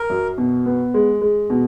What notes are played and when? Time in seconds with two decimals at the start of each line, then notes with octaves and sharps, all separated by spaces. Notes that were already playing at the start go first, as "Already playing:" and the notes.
Already playing: A#4
0.10 F#2
0.38 B2
0.66 B3
0.94 G#3
1.21 G#3
1.50 B2